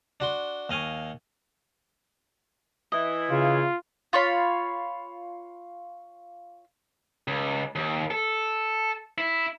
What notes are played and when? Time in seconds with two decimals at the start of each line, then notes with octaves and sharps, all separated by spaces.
0.20 D4 F#4 C6
0.69 D#2 D#5 F5 G#5 C#6
2.92 E3 E4 D#5
3.31 C#3 F4
4.13 F4 C#5 B5
7.28 C#2
7.75 D#2
8.11 A4
9.18 E4